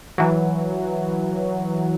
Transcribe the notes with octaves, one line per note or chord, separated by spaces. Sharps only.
E3 F#3